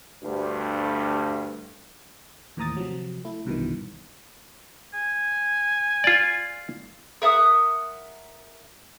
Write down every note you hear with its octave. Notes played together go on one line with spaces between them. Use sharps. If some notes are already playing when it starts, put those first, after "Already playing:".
D2 G2
D#2 A2 E3 A#5 D#6 A6
C3 F3 F#3
A3 E4
C2 G2 B2 D#3 E3
G#5
F4 D5
A#4 E5 F#5 D#6